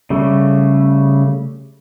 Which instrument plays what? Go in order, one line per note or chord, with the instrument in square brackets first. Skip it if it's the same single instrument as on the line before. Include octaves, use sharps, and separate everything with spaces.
[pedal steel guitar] C#3 G3 A3